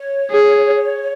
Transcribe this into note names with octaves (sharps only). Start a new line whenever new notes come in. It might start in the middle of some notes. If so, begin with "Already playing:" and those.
Already playing: C#5
G#4